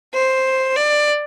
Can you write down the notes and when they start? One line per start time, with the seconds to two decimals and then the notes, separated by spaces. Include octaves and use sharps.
0.13 C5
0.76 D5